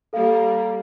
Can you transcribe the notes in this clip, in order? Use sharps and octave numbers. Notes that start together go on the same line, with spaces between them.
G3 A#3 A4 F5